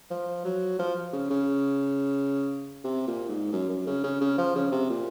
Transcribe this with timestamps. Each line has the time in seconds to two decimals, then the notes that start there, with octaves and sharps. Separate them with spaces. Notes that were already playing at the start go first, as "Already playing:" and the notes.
0.11 F3
0.45 F#3
0.79 F3
1.13 C#3
1.30 C#3
2.84 C3
3.07 A#2
3.29 G#2
3.53 F#2
3.70 F#2
3.87 C#3
4.04 C#3
4.21 C#3
4.38 F3
4.56 C#3
4.72 C3
4.90 A#2